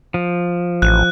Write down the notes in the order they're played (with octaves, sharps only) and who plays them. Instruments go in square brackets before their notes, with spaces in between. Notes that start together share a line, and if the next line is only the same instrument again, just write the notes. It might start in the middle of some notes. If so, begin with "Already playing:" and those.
[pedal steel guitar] F3
[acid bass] A1 [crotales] F#6